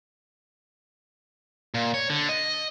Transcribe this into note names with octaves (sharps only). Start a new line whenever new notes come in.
A#2
C#5
D3
D#5